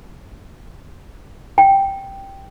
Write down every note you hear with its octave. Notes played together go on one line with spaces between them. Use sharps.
G5